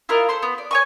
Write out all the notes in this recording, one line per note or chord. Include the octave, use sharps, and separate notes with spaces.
E4 F4 A#4 D#5
A4 C5 C6
B3
D5
C#5 G#5 C#6